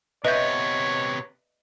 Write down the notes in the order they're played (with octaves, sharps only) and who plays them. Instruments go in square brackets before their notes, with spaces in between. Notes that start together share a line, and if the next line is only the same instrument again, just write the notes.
[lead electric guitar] C3 B3 [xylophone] B4 E5 G6 [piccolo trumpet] C#5 [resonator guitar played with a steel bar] D#5